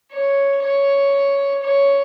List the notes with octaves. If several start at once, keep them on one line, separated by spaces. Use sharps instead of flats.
C#5
C#5
C#5